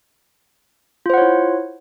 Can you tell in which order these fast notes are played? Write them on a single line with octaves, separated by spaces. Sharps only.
F4 C5 F#5 C#5 E4